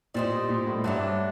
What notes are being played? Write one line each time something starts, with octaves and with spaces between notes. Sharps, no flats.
A#2 G3 C4 D#4
A#2
A2
G2 F#3 A3 D4